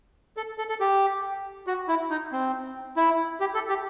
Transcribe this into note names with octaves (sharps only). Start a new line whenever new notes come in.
A4
A4
A4
G4
F#4
E4
D#4
C4
E4
G4
A4
G4